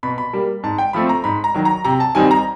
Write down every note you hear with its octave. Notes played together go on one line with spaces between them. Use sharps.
B2 B5
B5
G3 A#3
G#2 A5
G5
F3 A3 C4 B5
A#5
G#2 B5
A#5
D#3 F#3
A#5
C3 A#5
A5
D#3 G3 C4 D#4 G#5
A#5